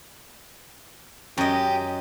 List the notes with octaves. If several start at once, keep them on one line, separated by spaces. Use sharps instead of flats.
F#2 G4 D#5